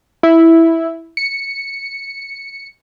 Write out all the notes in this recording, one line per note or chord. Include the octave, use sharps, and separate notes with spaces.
E4
C#7